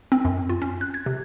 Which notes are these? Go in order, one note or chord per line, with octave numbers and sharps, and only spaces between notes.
C4
F#2
F4
C#4
F#6
G#6
C3